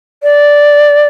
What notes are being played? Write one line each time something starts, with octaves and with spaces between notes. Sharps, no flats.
D5